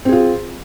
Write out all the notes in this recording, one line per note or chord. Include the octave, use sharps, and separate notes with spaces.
C4 F4 G#4